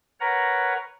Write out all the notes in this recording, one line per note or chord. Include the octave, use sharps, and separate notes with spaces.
A#4 B4 C#5 F#5 A#5